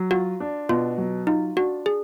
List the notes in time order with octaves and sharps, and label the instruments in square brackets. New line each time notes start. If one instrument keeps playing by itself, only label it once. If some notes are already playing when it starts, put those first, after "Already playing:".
Already playing: [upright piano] F#3
[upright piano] F4 [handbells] F#4
[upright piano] D4
[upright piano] B2 [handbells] F4
[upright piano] F#3
[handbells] D#4 [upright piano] F4
[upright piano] D4 [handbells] F#4
[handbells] G#4